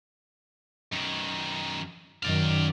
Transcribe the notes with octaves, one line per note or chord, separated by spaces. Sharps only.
F#2 D#3
F#2 D#3 D5 F5